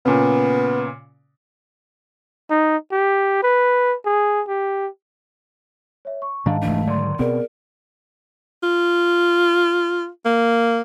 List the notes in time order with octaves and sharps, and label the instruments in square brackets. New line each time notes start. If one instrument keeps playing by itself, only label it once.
[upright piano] A#2 C#3 [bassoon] B3
[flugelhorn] D#4
G4
B4
G#4
G4
[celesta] C#5 E5
C#6
[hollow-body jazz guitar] G#2 [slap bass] D#3 D4 [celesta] D#5 F5 A5
[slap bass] F1 E3 D4 [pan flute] A3
[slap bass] D3 D#3 F#3 [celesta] D5 C6
[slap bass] B2 B3 C4 [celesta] G#4 D5 [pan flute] A#4
[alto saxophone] F4
A#3